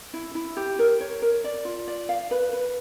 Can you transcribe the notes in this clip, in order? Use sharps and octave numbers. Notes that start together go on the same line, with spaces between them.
E4
E4
G4
A#4
C#5
A#4
D5
F4
D5
F5
B4
B4